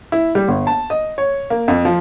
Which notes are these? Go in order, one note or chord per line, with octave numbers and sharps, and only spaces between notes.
E4
G3
G1
A5
D#5
C#5
A#3
F2
F3